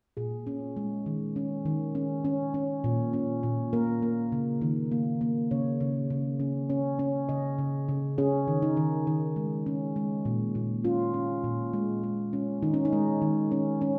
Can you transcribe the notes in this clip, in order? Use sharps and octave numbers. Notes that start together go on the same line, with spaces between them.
A#2 G#4
C#4
G#3
D#3
C#4
D#3
C#4
C#4
C#4
A#2
C#4
A#2
A#3 A#4
A#3
C#3
D#3
A#3
A#3
C#3 C#5
C#3
C#3
C#4
C#4
C#4
C#3 D#5
C#3
C#3
C#4 G#4
D#3
D#4
D#3
D#3
G#3
C#4
G#3
A#2
A#2
C#4 F4
C#4
A#2
G#3
G#3
C#4
D#3 D#4
C#4
D#4
G#3
D#3
C#4
C#4